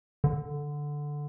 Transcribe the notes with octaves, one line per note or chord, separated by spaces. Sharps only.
D3